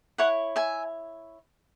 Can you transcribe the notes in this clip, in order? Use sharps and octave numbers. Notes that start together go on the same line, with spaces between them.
E4 C#5 F#5
E5 G#5